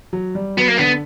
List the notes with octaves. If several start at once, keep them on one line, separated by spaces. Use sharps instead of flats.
F#3
G3
F#3 B3
A#3
D3 B3